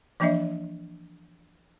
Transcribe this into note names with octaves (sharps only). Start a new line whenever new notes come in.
E3 F3 A#3 D4 D#5 E5